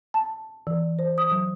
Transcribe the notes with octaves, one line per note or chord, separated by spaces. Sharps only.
A5
E3
C5
D#6
F#3